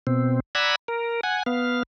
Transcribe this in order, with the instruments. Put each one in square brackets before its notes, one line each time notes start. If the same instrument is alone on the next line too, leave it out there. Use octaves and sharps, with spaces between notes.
[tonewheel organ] B2 C4
D5 F#5 G#5 A#5 B5 E6
A#4
F#5 G#5
B3 F5